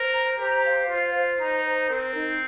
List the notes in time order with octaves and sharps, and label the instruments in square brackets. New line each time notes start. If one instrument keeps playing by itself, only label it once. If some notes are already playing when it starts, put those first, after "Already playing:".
Already playing: [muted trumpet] A#4 [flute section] C5
[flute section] A#5
[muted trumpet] G4 [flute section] C5
[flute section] F5
[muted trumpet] F4 [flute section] C5
[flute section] C5
[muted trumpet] D#4 [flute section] A#5
[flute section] C5
[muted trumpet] C4 [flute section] A#4
[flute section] D#4